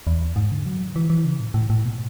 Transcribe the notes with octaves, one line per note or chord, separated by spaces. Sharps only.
E2
G#2
D3
F#3
E3
E3
C#3
A2
A2
A2
B2